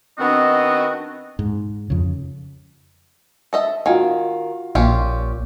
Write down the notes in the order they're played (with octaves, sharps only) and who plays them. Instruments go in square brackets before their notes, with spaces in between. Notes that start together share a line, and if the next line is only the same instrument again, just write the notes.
[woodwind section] D#3 B3 C4 D4 F#4 D#5
[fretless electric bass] G#2
F2 C#3
[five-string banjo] A4 D#5 E5
[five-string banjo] D#3 G#5 [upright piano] F4 F#4 F5
[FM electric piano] A#1 [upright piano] A#2 [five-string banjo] C#4 F4 G4